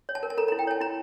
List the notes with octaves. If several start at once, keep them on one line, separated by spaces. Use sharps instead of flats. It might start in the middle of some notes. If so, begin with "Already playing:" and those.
C#5
A5
A#4
A5
A4 A#5
E4 A#5
G5
C#5 A5
E4 A#5